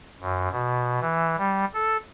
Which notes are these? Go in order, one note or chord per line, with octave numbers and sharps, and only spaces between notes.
F#2
B2
E3
G3
A4